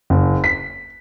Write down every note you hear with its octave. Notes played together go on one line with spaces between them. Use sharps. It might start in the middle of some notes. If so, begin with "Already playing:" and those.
F#1
B6